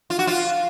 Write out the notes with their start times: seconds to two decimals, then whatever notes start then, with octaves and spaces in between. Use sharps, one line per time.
0.10 F4
0.19 F#4
0.27 F4